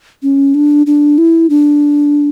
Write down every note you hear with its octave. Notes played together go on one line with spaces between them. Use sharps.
C#4
D4
D4
E4
D4